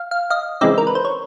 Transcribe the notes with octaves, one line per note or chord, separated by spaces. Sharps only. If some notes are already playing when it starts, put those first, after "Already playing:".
Already playing: F5
F5
D#5 F5
C#3 E3 G#3 C4 D#4 D5 E5
A#4
B4
C5
C#5